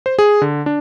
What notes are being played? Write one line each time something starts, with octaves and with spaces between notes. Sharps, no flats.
C5
G#4
D3
D4